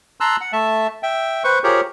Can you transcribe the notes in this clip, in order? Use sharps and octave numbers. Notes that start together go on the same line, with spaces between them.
A5 A#5 C6 E6 F#6
F#5
A3 E5 A5
E5 G5
B4 C5 C#6
F4 G4 G#4 A#4 C5 C#5